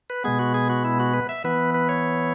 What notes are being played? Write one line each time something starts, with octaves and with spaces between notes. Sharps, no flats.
B4
B2 G#3 B3 G#4
F#4
G#4
F#4
E4
F#4
B4
E5
E3 B3 B4
B4
C#5